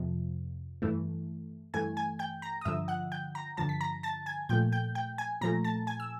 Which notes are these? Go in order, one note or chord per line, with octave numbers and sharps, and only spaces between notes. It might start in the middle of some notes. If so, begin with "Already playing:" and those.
Already playing: F2 C3 F3
G2 E3 A3
G2 E3 A3 G#5 G#6
G#5 G#6
G5 G6
A#5 A#6
D#6
G2 D3 F3 E5 E6
F#5 F#6
G5 G6
A#5 A#6
G2 D3 F3 A5 A6
B6
A#5 A#6
A5 A6
G#5 G#6
A#2 F3 A3 G5 G6
G5 G6
G5 G6
G#5 G#6
A#2 F3 A3 A#5 A#6
A5 A6
G#5 G#6
E6